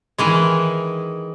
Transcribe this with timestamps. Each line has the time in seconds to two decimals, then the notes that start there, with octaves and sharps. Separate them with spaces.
0.18 D#3 E3 G#3